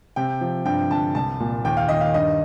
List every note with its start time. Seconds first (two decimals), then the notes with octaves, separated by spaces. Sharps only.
0.16 C3 G5
0.41 F3
0.65 G2 G5
0.90 D3 A5
1.15 C2 A5
1.40 A#2
1.65 D#2 G5
1.77 F5
1.89 D#3 D#5
2.01 F5
2.14 G2 D#5